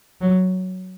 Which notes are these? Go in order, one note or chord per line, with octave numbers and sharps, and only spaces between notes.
F#3